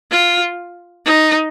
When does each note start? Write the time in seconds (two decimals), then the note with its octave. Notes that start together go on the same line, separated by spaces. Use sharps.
0.12 F4
1.06 D#4